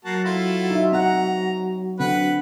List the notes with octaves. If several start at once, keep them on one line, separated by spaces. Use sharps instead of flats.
F#3 A#3 F#4 A5
E4 F4 A4
D#4 E5
C4 F#5 A#5
D3 C4 B4 F#5